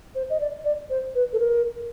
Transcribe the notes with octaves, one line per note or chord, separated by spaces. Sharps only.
C5
D#5
D5
D5
C5
B4
A4
A#4